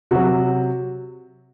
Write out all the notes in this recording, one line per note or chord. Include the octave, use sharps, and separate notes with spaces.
C3 F#3 F#4